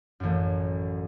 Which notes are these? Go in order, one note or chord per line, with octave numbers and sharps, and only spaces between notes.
A1 F#2